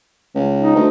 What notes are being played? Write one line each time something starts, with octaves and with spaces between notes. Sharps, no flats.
C#2
D#4
D2